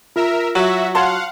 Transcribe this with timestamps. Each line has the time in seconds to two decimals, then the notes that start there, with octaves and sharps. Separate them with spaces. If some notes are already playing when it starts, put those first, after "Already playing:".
0.16 F4 A#4 E5
0.55 F#3 F#4 E5
0.95 C#5 F5 F#5 A5 C6